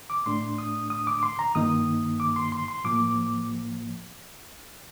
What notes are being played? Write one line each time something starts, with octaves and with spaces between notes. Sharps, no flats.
D6
A2 A3 D4 C6
D#6
D#6
D6
C6
A#5
G2 D#3 A#3 D#4 D#6
D6
C6
C6
C6
A2 F3 A#3 D6